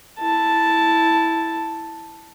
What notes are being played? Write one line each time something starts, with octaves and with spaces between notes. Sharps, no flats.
E4 A5